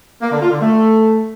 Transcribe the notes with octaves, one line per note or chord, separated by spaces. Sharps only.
A#3
D3
F4
D3
A3